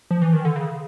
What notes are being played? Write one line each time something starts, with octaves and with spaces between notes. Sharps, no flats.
F3
E3
D#3
D3
C#3